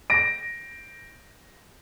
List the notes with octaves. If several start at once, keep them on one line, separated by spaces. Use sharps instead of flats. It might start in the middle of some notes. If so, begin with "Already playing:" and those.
A#6 D7